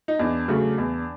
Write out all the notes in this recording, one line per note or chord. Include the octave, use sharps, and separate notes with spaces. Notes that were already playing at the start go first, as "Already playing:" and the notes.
D#4
E2 D4
C#3 F#3 A3
E2